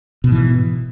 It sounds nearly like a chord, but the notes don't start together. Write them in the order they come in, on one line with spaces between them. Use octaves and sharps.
B2 G#2 E3